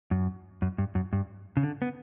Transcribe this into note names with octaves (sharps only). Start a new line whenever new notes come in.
F#2
F#2
G2
F#2
G2
C#3
D3
B3